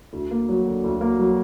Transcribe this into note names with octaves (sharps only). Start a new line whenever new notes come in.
D2
A#3
F#3
D3
D2
A#3
F#3